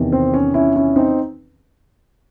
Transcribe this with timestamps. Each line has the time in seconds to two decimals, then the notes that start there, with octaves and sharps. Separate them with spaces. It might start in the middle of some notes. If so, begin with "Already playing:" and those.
Already playing: E2 C3 D#3
0.12 C4
0.34 C#4
0.54 C#4 E4
0.76 C#4 E4
0.96 C4 D#4